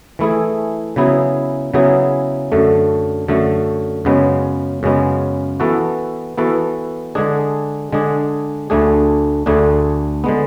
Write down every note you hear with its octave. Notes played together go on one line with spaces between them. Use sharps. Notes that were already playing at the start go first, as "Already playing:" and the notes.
E3 A3 E4 G#4
C#3 F#3 B3 E4 G#4
C#3 F#3 B3 E4 G#4
F#2 D3 A3
F#2 D3 A3
F#2 C#3 G#3 B3
F#2 C#3 G#3 B3
E3 B3 F#4 A4
E3 B3 F#4 A4
D3 G#3 D4 G#4
D3 G#3 D4 G#4
D2 D3 A3 D4 G#4
D2 D3 A3 D4 G#4
D3 G#3 B3